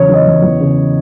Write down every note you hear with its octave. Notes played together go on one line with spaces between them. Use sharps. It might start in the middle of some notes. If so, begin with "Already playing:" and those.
Already playing: E2 C#3 F#3 C#5
E3 D#5
E2
E2
C#3